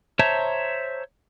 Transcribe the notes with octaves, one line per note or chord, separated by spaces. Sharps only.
C5 C#5 E5 A5 A#5